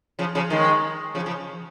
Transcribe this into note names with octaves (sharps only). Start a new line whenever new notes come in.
C#3 F3
C#3 F3
D#3 G#3
C#3 F3
C#3 F3